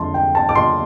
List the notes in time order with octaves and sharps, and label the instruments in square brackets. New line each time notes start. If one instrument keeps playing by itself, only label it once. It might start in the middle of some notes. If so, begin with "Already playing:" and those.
Already playing: [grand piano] F2 D3 G3 A5 C6
G5
A5
D6
C6